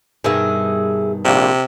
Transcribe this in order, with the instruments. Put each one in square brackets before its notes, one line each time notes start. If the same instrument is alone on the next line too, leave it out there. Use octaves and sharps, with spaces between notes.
[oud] G2 B2 D#3 [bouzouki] G#4 E5
[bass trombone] A#1 [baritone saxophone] C3